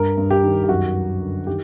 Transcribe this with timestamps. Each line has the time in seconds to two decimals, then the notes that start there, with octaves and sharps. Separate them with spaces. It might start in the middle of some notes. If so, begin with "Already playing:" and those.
Already playing: G2 A#4
0.17 G2
0.31 G4
0.44 D#3
0.64 G4
0.69 F#2 F#4
0.95 F#2
1.21 D3
1.47 D#3 G4